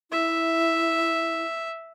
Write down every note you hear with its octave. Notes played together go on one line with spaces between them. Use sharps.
E4 E5